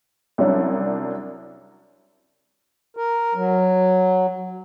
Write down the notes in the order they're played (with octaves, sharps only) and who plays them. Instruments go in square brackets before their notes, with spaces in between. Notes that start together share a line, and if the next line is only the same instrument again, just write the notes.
[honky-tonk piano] C2 F#3 C#4 D4
[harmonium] A#4
F#3